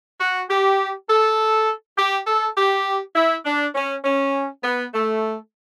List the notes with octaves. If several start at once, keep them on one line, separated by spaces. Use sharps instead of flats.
F#4
G4
A4
G4
A4
G4
E4
D4
C#4
C#4
B3
A3